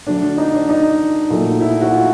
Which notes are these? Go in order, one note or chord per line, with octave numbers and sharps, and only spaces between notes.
D3 F#3 A3 D4
D#4
D4
D#4
A#2 F#3 A3
E4
F#4
F4